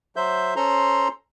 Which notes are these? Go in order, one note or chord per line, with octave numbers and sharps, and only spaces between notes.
F#3 C5 E5 G6
C#4 A4 C5 A#5 C6